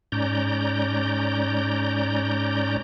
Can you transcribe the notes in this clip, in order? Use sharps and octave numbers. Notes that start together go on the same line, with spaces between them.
G#2 C#4 D5 A#5 G6